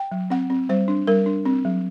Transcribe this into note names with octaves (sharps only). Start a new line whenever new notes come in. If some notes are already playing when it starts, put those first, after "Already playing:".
Already playing: G5
F#3
C4 F#5
C4
G3 C5
D4
G3 A#4
D4
C4
F#3